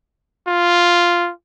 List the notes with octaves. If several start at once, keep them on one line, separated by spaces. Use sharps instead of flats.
F4